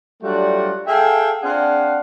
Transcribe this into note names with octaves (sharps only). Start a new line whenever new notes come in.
F#3 G3 A3 D4 F4 F#4
G#4 A4 E5 F5 G5
C4 D4 G#4 F5 F#5